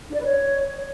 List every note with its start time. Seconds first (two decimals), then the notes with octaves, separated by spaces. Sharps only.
0.09 D4
0.14 D5
0.19 B4
0.25 C#5